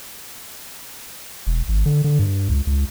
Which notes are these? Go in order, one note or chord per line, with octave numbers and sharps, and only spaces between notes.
E1
G#1
D3
D3
G2
C#2
C#2